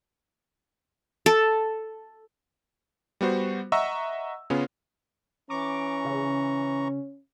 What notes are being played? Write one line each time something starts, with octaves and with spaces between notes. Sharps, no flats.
A4
G3 B3 F#4 C5
D#5 E5 F#5 A#5 C#6 E6
C#3 B3 C#4 F4
E3 C#4 A#5 C#6 D6
C#3